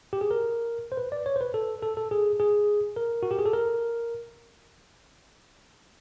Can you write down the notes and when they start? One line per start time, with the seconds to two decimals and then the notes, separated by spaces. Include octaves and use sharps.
0.13 G4
0.21 G#4
0.31 A#4
0.92 C5
0.97 B4
1.12 D5
1.26 C#5
1.36 C5
1.41 B4
1.54 A4
1.82 A4
1.97 A4
2.11 G#4
2.40 G#4
2.96 A#4
3.23 F#4
3.31 G4
3.39 G#4
3.46 A4
3.53 A#4